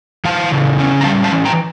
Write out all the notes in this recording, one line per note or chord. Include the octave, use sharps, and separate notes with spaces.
E3 F5 A5
C#3
C#4
A#5
G3 F5 A5
F5 A5
E3
G5 A#5